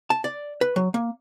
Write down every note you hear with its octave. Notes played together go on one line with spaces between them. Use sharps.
A5
D5
B4
F#3
A#3